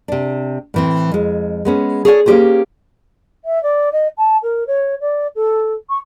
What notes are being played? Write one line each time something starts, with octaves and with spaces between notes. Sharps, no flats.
C3 D4
A2 E3 C4
F2 G#3
G#3 B3 C#4
G#4 A4 C#5 D5 F#5 G#5
A#3 C#4 D#4 G4 G#4 C5
E5
D5
D#5
A5
A#4
C#5
D5
A4
C#6